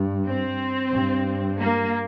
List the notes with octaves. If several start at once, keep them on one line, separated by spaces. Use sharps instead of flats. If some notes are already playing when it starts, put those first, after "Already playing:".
Already playing: G2
C4
G2
A#3